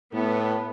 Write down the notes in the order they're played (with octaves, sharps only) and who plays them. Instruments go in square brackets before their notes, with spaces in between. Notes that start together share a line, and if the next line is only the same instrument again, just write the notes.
[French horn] A2 [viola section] B3